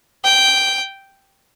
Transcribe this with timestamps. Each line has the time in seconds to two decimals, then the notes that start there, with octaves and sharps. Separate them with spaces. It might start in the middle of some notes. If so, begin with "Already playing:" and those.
0.24 G5